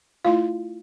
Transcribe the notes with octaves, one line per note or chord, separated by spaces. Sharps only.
A3 E4 F4 F5